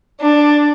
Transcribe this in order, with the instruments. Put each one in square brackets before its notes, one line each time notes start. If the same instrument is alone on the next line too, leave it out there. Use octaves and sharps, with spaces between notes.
[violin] D4